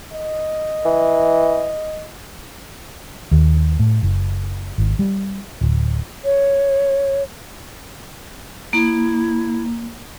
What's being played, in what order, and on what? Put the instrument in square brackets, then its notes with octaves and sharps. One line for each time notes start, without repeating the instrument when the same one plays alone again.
[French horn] D#5
[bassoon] E3
[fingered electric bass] D#2
A2
F#1
G#1
G3
D1
[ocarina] C#5
[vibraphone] A#3 [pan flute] E4